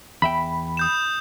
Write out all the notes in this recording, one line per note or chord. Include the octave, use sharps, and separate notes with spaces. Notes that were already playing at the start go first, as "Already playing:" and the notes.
E2 E5 G5 B5
D#6 G6 E7